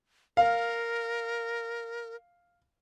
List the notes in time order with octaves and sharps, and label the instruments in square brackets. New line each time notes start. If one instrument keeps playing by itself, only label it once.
[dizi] A#4 [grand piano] F5